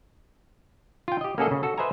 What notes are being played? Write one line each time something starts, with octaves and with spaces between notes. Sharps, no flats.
F4 G5
G4 D#5
A#3 C#4 F#4 G#4 A4 D#5
C#3
F#4 A4
B4 C5 D#5 E5 G#5 A#5